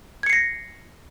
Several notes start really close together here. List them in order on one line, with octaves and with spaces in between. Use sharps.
G#6 C#7 C7 A#6